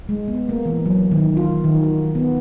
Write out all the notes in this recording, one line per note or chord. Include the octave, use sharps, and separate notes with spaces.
G#3
B3
A#3
E3
F#3
D#3
F4
D#3
F#4
B3